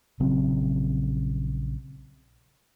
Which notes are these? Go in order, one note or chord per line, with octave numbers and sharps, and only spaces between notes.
A#1 C#3 F#3 C4